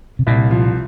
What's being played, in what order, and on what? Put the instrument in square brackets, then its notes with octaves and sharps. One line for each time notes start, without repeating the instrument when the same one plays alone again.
[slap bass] C3
[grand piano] C2 [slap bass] A#2
[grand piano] F3